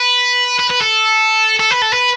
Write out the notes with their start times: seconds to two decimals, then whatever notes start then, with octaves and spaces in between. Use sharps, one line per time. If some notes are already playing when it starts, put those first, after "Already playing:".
Already playing: B4
0.59 B4
0.70 B4
0.82 A4
1.60 A4
1.71 B4
1.82 A4
1.93 B4